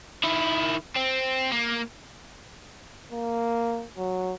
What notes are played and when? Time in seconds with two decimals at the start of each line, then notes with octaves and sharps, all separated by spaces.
0.24 D#3 E4
0.96 C4
1.52 A#3
3.12 A#3
3.97 F#3